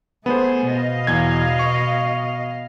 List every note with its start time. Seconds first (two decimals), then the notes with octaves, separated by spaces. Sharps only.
0.26 A3 B3 G#4 C5
0.74 B2 D#5 F5
1.07 E2 G#6
1.59 C#6